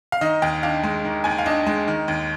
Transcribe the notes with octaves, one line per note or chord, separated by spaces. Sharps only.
F5
D#3 D#5
D#2 G5
D4 F5
G#3
D#3
D#2 G#5
G5
F5
D4 D#5
G#3
D#3
D#2